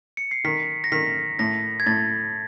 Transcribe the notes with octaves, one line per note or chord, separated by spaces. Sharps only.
C#7
C7
D#3 B6
A#6
D#3 B6
A2 A#6
G#6
A2 A6